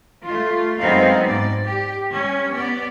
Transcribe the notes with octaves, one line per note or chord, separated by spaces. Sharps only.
A3 F4
F#2 G#3 B3 C4 D#4 F5
G#2 D5
G4
G3 C#4
B3 D5